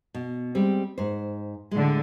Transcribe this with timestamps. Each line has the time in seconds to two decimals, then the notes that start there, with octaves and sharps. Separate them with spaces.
0.14 B2
0.55 G3 G#3 C4
0.98 G#2 C5
1.71 A2 D3 G#3